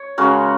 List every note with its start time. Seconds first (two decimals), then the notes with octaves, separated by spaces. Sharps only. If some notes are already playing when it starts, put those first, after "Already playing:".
Already playing: C#5
0.18 C#3 G#3 F#4 A#4